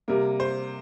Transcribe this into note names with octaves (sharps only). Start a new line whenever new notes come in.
C3 G3 A#3 A#4
C5